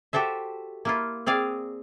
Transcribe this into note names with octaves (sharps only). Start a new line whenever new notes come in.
F#4 G4 A4 C5 E5
A#3 E4 F4
C4 G#4 D5 F5